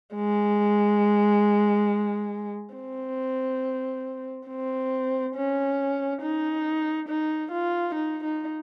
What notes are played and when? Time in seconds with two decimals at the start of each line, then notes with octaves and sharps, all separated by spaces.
0.15 G#3
2.75 C4
4.48 C4
5.35 C#4
6.22 D#4
7.09 D#4
7.52 F4
7.95 D#4
8.24 D#4